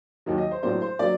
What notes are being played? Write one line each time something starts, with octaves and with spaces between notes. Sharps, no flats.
D#2 D#3 F#3
D#5
C5
A2 F#3 A#3 D4 C5
C5
F#3 A#3 D4 D5